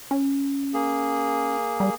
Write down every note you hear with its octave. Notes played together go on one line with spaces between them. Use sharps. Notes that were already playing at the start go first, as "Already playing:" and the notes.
C#4
A#3 G#4
G3